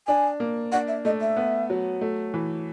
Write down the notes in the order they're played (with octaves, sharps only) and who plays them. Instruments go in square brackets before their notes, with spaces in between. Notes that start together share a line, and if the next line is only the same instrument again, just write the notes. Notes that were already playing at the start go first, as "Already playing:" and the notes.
[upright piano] D4 [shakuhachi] G#5
[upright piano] A#3
[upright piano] D4 [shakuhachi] F#5
[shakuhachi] E5
[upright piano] A3 [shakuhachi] D#5
[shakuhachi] E5
[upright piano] B3
F#3
A3
E3